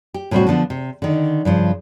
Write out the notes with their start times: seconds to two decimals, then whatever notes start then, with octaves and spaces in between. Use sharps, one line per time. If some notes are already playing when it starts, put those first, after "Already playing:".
0.14 G4
0.31 A2 C3 G3 C4 D4 F#4
0.47 D3 F3 B3 D4
0.70 C3
1.02 D3 D#3
1.45 G2 C#3 F3